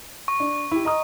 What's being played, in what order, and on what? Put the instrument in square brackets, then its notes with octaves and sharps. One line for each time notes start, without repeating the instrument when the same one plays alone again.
[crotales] C#6
[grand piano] D4
E4 G4
D#5 A#5 D#6